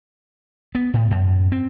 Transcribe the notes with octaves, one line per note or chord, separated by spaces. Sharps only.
B3
A2
F#2
C4